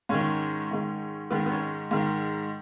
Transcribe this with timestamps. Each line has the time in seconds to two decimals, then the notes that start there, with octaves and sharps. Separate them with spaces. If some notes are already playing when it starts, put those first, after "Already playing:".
0.09 G#2 D#3 C#4
0.71 G#2 D#3
1.31 G#2 D#3 B3
1.46 B3
1.52 C#4
1.91 G#2 D#3